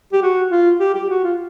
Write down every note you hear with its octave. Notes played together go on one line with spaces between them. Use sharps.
G4
F#4
F4
G4
G4
F#4
F4